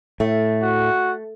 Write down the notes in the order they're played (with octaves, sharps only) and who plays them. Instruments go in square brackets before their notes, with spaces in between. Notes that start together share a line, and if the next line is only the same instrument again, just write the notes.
[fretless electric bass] A2 [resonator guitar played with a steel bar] A3
[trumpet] F#4